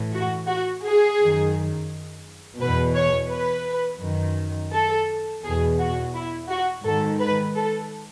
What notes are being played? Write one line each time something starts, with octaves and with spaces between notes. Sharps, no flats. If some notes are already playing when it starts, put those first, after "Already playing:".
Already playing: A2 E3
F#4
F#4
G#4
F#2 D#3
E2 B2 B4
C#5
B4
F#2 D#3
A4
E2 B2 G#4
F#4
E4
F#4
G#2 D#3 A4
B4
A4